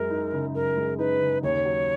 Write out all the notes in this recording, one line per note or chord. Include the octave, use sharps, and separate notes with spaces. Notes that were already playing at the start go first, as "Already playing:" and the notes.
Already playing: F#2 G#3 A#4
D#4
C#3
F#2 A#4
G#3
D#4 B4
C#3
D#2 C#5
F#3